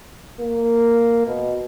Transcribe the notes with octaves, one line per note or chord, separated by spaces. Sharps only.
A#3
B2